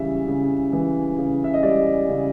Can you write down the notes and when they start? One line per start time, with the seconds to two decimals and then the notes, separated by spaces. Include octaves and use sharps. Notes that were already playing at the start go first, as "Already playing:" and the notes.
Already playing: C#3 E3 G3 E5
0.28 C#3
0.73 E3
1.18 C#3
1.44 E5
1.54 D#5
1.63 G3 D5
2.09 C#3